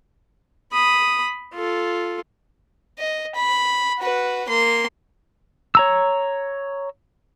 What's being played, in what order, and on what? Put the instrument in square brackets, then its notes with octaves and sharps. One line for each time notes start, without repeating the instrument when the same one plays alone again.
[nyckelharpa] B5 D#6
F4 A4
[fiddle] D#5
B5
F#4 B4
A#3 C6
[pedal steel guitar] C#5 A#5 E6